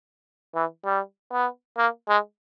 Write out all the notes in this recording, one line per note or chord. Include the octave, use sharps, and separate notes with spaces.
E3
G3
B3
A#3
G#3